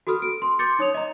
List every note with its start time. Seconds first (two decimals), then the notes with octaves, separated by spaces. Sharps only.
0.07 F#4 A4 B5 D#6 F6
0.22 D7
0.42 C6
0.59 C6 D6 G6 A6 C#7
0.79 D#4 C#5 D#6 F7
0.94 D#5 A#5